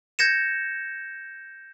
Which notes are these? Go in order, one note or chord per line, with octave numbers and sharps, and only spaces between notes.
G6 G#6 A#6 C#7 E7